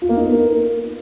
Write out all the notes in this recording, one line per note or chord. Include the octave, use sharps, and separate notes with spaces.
F4
A#3
D#4
B3
A#4